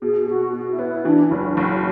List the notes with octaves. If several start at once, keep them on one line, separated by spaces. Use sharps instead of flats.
B2 G#4
B2 F#4
B2 F#4
E4
B3
E4
E3 D4
F#1 E4
F#4
F#1